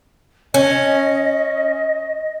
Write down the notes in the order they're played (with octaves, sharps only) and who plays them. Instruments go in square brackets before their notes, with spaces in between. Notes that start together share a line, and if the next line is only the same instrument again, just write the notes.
[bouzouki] C#4 [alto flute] D#5